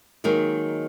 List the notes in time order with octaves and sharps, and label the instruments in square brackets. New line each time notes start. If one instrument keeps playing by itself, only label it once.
[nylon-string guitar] D#3 F#3 G#3 A#3